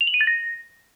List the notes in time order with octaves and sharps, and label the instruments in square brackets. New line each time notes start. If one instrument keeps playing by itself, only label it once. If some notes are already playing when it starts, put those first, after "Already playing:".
[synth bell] F7
F#7
D#7
A6
A#6